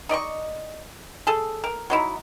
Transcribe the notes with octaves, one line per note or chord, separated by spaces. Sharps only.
D#4 D5 D#5 C#6
G#4 A4
A#4
F#3 D#4 E4